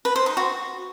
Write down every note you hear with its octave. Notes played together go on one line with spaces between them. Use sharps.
B4
C5
D#4
F#4